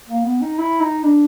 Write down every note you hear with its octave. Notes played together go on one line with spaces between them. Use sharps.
A#3
B3
D#4
E4
D#4
D4